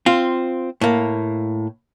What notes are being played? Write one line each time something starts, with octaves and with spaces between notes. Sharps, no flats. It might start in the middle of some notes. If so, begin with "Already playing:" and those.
C4 F4
A2 A#3